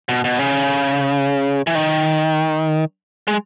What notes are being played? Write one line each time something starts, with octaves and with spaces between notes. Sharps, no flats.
B2
B2
C#3
E3
D#3
G#3